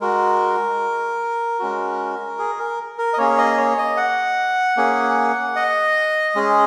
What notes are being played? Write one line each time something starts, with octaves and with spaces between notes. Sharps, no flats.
G#3 F#4 A#4
G#3 C#4 F#4
G#4
A#4
A#4
D#5
A#3 C#4 G#4 C#5
D#5
C#5
D#5
F#5
A#3 C#4 G#4
D#5
G#3 C#4 G#4